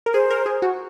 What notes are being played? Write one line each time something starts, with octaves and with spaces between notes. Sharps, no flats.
A#4
G#4 C5
A#4
G#4
F#4